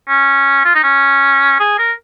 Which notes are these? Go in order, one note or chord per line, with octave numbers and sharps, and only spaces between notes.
C#4
F4
D#4
C#4
G#4
A#4